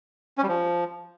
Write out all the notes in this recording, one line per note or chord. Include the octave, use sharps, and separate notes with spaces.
C#4
G3
F3